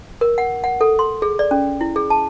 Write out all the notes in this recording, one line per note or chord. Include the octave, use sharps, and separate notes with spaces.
A#4
F#5
F#5
A4
C6
G#4
D5
C#4
E4
G#4
A5